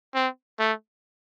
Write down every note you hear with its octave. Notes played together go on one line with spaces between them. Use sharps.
C4
A3